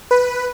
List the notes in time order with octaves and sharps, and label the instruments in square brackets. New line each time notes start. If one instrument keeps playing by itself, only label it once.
[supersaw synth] B4